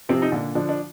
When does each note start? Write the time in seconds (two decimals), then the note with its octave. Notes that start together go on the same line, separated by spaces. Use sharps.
0.09 C3 F3 C4
0.22 D#4
0.32 A#2 D3 D4
0.55 D3 F3 D4
0.69 D4